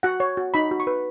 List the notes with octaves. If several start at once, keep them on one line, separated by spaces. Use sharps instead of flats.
F#4 F#5
C#5
F#4
D#4 B5
F#4
C#6
B4